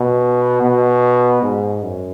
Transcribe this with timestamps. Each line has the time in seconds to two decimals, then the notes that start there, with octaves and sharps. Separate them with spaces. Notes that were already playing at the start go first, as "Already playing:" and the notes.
Already playing: B2
0.62 B2
1.43 G#2
1.83 F#2